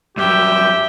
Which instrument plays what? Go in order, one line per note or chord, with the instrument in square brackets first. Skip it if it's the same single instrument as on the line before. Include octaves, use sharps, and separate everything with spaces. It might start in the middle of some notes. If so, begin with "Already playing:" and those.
[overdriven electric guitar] G2 F#3 [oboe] G4 [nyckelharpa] E5 G5